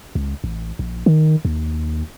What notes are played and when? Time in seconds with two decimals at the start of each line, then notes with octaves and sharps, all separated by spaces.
0.15 C#2
0.44 A1
0.79 A#1
1.06 D#3
1.45 D#2